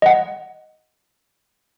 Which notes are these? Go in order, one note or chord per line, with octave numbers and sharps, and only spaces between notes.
D#5 F#5